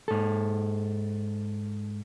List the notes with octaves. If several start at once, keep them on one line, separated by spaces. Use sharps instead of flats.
G#2 A4